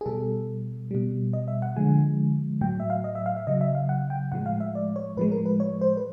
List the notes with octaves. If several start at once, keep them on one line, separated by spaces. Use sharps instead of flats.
G#4
B2 G3 A4
B2 G3
D#5
E5
F#5
D3 F3 G#3 G#5
A2 F#3 G5
E5
F5
D#5
E5
F5
E5
C#3 F#3 D#5
E5
F5
F#5
G5
A2 F3 G#3 F#5
F5
E5
D5
C#5
A2 F3 G#3 B4
A#4
B4
C#5
C5
B4